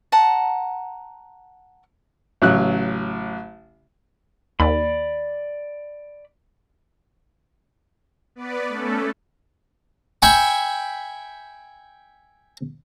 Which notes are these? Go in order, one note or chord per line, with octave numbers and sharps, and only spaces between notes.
F#5 A5 A#5
A1 C#3 F#3 F#6
D#2 D5 B5
B3 B4 D5
A3 C#4 A4
E5 G5 G#5 B5 C#6